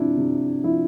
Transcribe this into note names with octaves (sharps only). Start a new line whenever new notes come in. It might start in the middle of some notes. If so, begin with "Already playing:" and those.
Already playing: C3 F3 D4 E4
C3
F3 E4